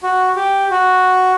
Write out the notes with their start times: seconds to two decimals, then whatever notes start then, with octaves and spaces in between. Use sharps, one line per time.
0.03 F#4
0.36 G4
0.71 F#4